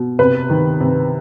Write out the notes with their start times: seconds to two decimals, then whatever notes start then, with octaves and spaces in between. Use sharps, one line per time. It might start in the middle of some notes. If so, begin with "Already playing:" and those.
Already playing: B2
0.19 C3 B4
0.50 D#3
0.81 C3